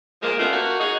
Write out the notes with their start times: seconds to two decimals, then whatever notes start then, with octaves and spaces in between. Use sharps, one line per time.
0.22 A#2 F3 G#3 A#3
0.38 G3 A3 B3 C#4 F4
0.52 A3 A#3 F#4
0.80 C#4 D#4 F#4 G#4